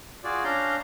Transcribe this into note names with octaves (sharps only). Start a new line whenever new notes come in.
F4 F#4 G#4 D5
C#4 D4 F5 A#5 G6